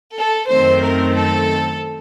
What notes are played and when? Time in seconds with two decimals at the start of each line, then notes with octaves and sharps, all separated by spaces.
0.18 A4
0.50 F#2 D#3 A3 C4 C5
0.82 A#4
1.15 A4